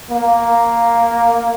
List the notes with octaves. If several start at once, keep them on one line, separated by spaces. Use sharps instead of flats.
A#3